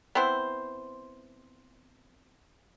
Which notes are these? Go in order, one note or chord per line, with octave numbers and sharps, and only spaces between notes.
B3 C4 E4 C5